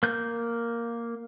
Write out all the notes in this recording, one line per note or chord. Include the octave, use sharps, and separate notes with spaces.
A#3 G6